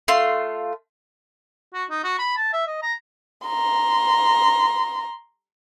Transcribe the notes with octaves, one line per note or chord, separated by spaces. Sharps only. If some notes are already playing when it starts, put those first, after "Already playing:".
A3 F4 C6
F#4
D#4
F#4
B5
A5
E5
D#5
A#5
A#5 C6